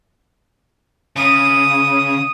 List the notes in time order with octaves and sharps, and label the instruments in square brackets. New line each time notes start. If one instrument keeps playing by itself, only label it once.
[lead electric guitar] C#3 [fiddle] D#6